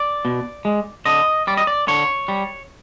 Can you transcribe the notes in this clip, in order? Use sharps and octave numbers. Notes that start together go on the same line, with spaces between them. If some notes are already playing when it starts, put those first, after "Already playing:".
Already playing: D5
B2
G#3
D3 D#5
G3 D5
D#5
D5
D3 C#5
G3